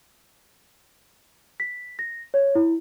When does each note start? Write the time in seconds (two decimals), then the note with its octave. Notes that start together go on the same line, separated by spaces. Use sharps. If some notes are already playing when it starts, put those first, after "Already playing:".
1.60 B6
1.99 A#6
2.34 C#5
2.55 E4